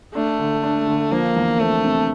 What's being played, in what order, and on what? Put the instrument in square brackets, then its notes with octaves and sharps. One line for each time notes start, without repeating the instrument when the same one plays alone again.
[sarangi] A3 [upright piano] D4
[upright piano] D3
D4
D3
[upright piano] F3 [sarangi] A#3
[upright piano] E2
[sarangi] A3 [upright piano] C4
[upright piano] C3